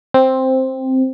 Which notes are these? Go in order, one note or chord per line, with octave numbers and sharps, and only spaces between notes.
C4